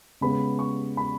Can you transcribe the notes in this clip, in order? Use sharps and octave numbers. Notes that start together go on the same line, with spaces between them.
C#3 G#3 B3 B5
C#6
B5